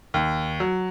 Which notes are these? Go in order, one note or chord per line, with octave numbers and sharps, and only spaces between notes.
D#2
F#3